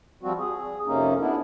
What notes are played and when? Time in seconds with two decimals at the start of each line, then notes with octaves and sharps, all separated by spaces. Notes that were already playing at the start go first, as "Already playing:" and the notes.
0.23 F3 G3 C4 F#4
0.38 G#4
0.87 F2 C3 A#3 C#4 D#4
1.20 B3 D4 E4